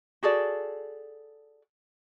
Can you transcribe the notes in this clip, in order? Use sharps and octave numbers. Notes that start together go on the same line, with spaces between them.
F#4 G#4 A4 D5